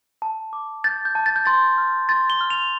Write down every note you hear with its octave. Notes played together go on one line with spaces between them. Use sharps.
A5
D6
G6 A6
G6
A5
A6
G6
C6 A6
F6
C6 A6
G7
F6
F7